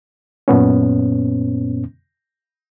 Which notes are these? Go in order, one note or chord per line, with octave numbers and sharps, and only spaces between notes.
F#2 A#2 B3 C#4